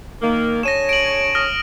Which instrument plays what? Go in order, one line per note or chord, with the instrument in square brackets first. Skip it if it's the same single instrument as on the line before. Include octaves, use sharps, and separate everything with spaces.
[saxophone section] D#3 A#3
[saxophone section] D4 G#4 C#5 [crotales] A#6 D#7 E7
[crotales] D7 F#7
D#6 F6 A#6